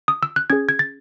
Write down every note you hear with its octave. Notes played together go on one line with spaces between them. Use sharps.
D#6
E6
F#6
C#4 G#4 G#6
G#6
A6